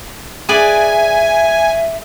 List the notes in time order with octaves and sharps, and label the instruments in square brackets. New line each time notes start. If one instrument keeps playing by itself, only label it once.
[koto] G#4 B4 D5 [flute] E5 [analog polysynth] G#5